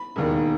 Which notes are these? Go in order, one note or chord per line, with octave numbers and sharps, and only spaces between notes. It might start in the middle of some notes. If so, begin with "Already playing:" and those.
Already playing: B5
E1 D#2 D#3